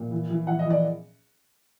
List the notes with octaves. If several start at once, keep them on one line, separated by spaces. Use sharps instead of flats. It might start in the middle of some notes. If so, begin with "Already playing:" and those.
Already playing: A#2
E3
E3
E3 F#5
D#5
E3
D5